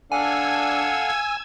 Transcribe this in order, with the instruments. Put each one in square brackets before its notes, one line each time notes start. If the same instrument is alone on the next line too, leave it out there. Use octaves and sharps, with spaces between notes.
[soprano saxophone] D4 [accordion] A4 F5 F#5 [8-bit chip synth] G#5 [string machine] E6 G#6